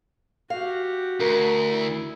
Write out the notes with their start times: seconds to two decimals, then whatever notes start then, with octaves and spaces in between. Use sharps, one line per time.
0.50 F#4 G4 F5
1.20 D2 A#4
1.70 E4